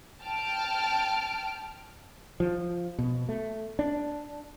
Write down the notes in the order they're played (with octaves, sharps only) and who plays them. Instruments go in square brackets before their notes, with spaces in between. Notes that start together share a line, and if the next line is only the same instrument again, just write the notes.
[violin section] G5 A5 F6 D7
[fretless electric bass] F3
B2
A3
D4